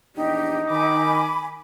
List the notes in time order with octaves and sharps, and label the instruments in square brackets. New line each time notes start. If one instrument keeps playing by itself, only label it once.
[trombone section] A#1 E2 D4 [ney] D#4 [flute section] G4
[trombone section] D#3 [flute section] G#5 B5 [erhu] D6